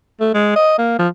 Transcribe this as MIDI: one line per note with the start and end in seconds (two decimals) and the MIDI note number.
0.20 0.31 57
0.34 0.52 56
0.56 0.76 75
0.78 0.94 58
0.99 1.08 53